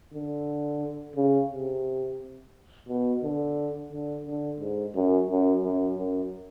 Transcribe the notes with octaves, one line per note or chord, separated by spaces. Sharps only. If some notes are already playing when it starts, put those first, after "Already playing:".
D3
C#3
C3
B2
D3
D3
D3
G#2
F#2
F#2
F#2
F#2